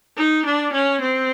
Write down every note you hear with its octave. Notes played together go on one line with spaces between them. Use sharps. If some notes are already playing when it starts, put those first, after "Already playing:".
D#4
D4
C#4
C4